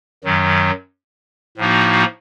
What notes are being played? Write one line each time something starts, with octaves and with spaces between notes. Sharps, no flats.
F#2 D#3 F#3
A2 F3 A#3 D#4 F#4